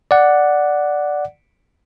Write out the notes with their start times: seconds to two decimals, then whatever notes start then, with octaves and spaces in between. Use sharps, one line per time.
0.11 D5 F#5